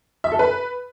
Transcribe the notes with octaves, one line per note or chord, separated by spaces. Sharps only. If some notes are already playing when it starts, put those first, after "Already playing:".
E5
A4
B4